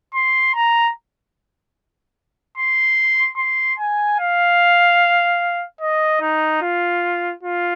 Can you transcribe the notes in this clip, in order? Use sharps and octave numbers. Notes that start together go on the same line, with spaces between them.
C6
A#5
C6
C6
G#5
F5
D#5
D#4
F4
F4